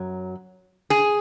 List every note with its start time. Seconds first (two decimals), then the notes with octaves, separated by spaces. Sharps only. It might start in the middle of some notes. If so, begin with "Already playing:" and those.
Already playing: F#2 F#3
0.90 G#4